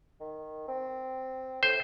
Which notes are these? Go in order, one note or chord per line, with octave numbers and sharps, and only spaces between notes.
D#3
C4
A2 C5